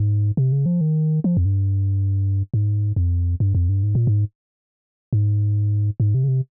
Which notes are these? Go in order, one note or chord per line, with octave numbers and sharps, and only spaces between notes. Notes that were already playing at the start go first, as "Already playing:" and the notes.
Already playing: G#2
C3
C#3
F3
D#3
F3
F2
G2
G#2
F2
G2
F2
G2
G#2
A#2
G#2
G#2
G#2
C3
C#3
C3